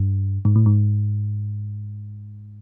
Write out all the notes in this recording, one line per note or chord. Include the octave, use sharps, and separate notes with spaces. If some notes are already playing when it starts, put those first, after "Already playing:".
Already playing: G2
G#2
A2
G#2